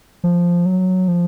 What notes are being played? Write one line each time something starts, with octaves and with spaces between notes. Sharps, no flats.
F3
F#3
F3